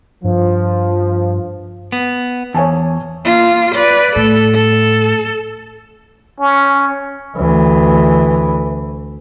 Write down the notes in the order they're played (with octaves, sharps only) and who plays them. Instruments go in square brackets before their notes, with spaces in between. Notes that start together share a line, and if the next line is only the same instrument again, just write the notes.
[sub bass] G2 [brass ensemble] F3
[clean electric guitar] B3
[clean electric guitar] E2 [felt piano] C#5 G#5 A5
[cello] A#3 F4
B4 D5
[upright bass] A2 [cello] A4
[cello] A4
[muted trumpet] C#4
[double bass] D2 E3